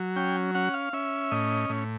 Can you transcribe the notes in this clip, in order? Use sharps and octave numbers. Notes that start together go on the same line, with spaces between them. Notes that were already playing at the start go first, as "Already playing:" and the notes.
Already playing: F#3
C#4 G5
C#4 F#5
F5
C#4 E5
A2 D#5
A2